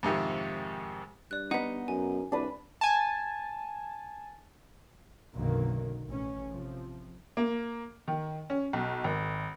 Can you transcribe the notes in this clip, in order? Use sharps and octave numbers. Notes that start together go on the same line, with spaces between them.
F2 G#2 C3 D#3
G2 D5 F#6
B3 D#4 F#5
F#2 G#5
C2 D4 B4
G#5 A5
B1 F#2 D3 D#3 F#3 A#3
A1 C#4
C3 F3
A#3
D#3
C#4
B1
G#1